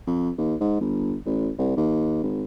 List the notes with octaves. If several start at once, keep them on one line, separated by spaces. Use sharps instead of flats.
F2
D#2
G#2
G1
A1
C2
D#2
G#1